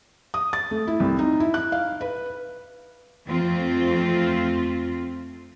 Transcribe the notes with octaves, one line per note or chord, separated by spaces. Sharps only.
D#6
A6
A3
E4
C2
D#4
E4
F#6
F5
B4
F2 A3 C4 F4